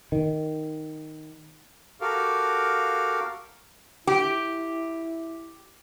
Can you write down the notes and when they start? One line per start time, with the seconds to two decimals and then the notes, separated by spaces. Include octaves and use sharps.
0.12 D#3
2.01 F#4 G4 A4 A#4 F5
4.07 E4 G4